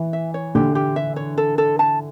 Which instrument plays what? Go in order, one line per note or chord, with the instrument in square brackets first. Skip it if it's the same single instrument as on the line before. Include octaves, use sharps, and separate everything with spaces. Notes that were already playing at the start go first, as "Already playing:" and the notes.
Already playing: [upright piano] E3
[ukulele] E5
C#5
[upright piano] D3 [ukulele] G4
[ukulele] G4
E5
C#5
A4
A4
A5